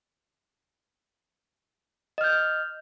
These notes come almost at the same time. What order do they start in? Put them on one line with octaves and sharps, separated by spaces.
D#5 F6 G6